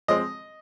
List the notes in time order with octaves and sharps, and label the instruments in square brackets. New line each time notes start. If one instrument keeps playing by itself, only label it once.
[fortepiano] F3 G#3 C4 D#5